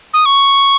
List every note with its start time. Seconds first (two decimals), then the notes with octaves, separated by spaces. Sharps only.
0.14 D#6
0.26 C#6